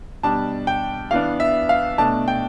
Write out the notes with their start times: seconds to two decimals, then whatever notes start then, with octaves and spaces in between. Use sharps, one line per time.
0.23 B2 G3 D4 A5
0.67 G5
1.11 E3 B3 D4 F5
1.40 E5
1.69 F5
1.98 B2 A3 D4 A5
2.28 G5